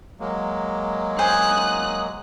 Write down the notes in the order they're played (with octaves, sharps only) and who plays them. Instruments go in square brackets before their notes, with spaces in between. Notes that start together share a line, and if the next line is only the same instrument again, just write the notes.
[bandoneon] F#3 G#3 A#3
[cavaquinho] C5 G#5 [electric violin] D#6 F#6